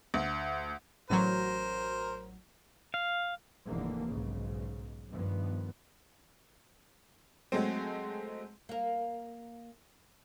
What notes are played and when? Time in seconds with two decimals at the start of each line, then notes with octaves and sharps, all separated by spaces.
0.14 D2
1.10 A1 F#3 A#4 C5
2.94 F5
3.67 F1 D#2 G#2 D3 E3 A#3
4.07 B1 G#2 C#3
5.10 G2 D#3 F3 B3
7.52 F#3 G#3 A3 C4
8.69 A#3 A#4